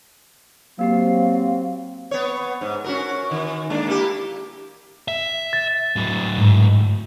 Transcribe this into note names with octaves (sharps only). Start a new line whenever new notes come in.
F#3 A#3 C4 G4 F5 C7
B3 C#5
G#2
C#4 F#4 A#4
D#3
G#3 A#3 D4
A#3 E4 G4
E5
A6
A2 F#3
G#2